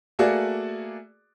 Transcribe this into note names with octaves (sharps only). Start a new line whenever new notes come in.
A3 A#3 F#4 G#4 D5